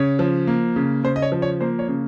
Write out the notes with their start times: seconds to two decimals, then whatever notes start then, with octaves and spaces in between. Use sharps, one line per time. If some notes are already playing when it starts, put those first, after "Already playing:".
Already playing: C#3 C#5
0.19 F3
0.47 A#3
0.76 C#3
1.04 C#3 C5
1.16 D#5
1.22 C#5
1.32 F3
1.42 C#5
1.61 A#3 C5
1.79 C#5
1.88 C#3